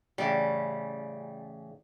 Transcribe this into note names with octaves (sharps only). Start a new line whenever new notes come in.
A1 C#3 G3